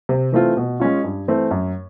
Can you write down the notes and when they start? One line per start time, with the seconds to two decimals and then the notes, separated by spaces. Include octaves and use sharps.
0.09 C3
0.32 E3 A3 C4 F4
0.57 B2
0.80 G#3 C#4 F4
1.04 G2
1.28 E3 A3 C4
1.51 F#2